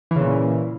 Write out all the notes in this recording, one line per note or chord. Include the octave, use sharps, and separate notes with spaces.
A#2 C#3 E3